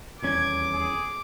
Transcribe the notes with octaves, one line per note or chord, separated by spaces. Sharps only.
D#1 E2 C#4 D6 G#6
G#4